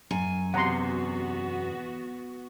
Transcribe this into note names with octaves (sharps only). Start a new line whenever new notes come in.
F#2 G#5
E2 C3 B3 F#4 F#5 A#5 C6